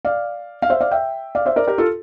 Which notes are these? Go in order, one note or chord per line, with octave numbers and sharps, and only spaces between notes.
D5 F5
F5
C5 E5
D5 F5
E5 G5
D5 F5
C5 E5
A#4 D5
G4 A#4
F4 A4